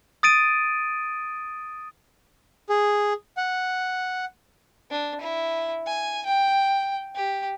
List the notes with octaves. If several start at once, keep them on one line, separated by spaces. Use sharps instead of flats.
D#6 A6 D7 D#7
G#4
F#5
D4
E4
G#5
G5
G4